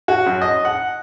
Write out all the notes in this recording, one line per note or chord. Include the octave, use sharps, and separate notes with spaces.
F#4
F#2
D#5
F#5